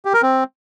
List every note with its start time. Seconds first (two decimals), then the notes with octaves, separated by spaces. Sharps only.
0.05 G4
0.14 A#4
0.22 C4